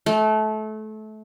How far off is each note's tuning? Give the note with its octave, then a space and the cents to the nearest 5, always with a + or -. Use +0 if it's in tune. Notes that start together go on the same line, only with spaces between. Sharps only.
A3 -25